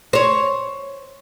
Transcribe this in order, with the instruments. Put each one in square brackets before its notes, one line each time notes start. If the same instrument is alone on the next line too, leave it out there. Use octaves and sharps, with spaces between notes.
[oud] C5 C#5